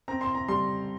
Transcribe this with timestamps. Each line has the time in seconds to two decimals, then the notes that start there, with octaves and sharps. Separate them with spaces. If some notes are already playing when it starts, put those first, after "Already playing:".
0.08 C4 A#5
0.21 C6
0.35 A#5
0.48 G3 C6